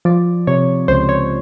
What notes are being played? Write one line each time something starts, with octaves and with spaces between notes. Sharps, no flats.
F3 D5
C3 C#5
C#2 C5
C#5